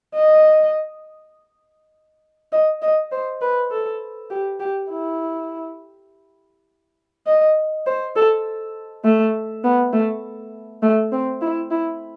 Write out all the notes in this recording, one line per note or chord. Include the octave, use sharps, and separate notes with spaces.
D#5
D#5
D#5
C5
B4
A4
G4
G4
E4
D#5
C5
A4
A3
B3
A3
A3
C4
E4
E4